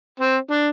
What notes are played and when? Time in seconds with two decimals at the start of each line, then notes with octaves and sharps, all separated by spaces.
0.20 C4
0.51 D4